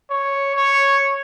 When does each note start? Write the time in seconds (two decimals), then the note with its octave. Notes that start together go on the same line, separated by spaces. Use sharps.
0.10 C#5
0.56 C#5